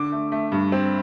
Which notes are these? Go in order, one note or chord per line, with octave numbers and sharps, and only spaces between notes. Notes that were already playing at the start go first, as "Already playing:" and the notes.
Already playing: D3 D6
A3
A3
G2
C4